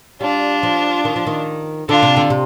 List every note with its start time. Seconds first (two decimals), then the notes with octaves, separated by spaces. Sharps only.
0.21 G3 D4 F4
0.63 F3
1.05 D#3
1.16 F3
1.27 D#3
1.88 D3 D4 F4
2.03 C3
2.17 D3
2.30 C3